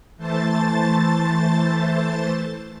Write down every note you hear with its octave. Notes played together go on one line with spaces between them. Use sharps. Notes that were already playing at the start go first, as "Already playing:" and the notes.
E3 A3 C5 A5 A6